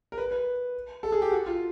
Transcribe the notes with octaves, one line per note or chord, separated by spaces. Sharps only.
A#4
B4
B4
A4
G#4
G4
F#4
F4